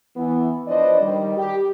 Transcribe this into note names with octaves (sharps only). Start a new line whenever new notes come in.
E3 B3
F3 D4 B4 C5 D5 D#5
D#3 G3
G4